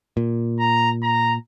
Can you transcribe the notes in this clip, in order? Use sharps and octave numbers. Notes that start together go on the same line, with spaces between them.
A#2
A#5
A#5